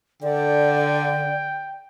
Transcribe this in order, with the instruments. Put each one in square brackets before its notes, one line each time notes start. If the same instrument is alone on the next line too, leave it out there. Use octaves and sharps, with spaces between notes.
[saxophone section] D3 [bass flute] D5 [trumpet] G5